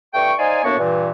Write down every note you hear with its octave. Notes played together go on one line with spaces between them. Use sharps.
G2 A3 G5 C#6
D#4 C5 D5 F5 G#5
F#2 A2 A#3 B3 D4 C#6
G2 A#2 E3